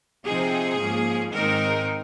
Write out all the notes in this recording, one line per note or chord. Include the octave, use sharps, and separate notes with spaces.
C3 F3 C4 D#4 G#4
G#2 F3 A#3 C#4
G#2 D#3 G#3 C4 D#4 A#4